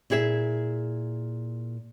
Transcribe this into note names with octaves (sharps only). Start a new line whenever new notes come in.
A#2 E4 G#4 C#5 E5